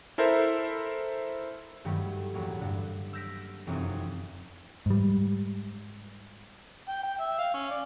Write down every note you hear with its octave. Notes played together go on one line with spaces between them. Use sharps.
E4 A4 A#4 C5 E5
G2 D#3 F#3 G3 A3
E2 A2 F#3 A#3
G2 D3
E6 F6 G6 A#6 B6 D7
F1 F#2 E3 C4 D#6
G#2 G3
G5
G5
E5
F5
C#4
D5